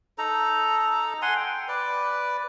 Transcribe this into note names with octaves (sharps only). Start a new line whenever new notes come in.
D#4 A4 A#5
F#5 G#5 C6
G5
B4 D5